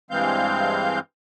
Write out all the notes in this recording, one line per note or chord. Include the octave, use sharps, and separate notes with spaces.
G2 E3 G#3 C4 F5 G6